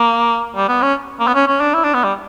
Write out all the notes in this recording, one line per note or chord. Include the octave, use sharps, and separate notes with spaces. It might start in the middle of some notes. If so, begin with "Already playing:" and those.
Already playing: A#3
G3
B3
C#4
A#3
B3
C#4
C#4
D4
E4
D4
B3
G3